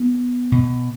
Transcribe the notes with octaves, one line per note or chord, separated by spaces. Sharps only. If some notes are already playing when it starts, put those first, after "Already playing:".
Already playing: B3
B2